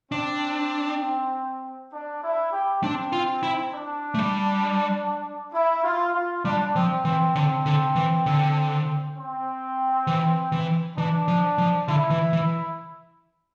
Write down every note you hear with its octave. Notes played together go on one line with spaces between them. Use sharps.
C4 D4
D4
E4
G4
C4 D4
F4
E4
D4
A3
G3
E4
F4
F4
G3 D4
F3 C4
E3 C4
D3 C4
D3
E3
D3
C4
E3
E3
E3 D4
F3
F3
D3 E4
E3
E3